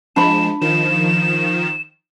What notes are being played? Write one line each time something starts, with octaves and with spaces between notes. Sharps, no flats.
F3 G#3 D4 B5 E7
D#3 F3 E7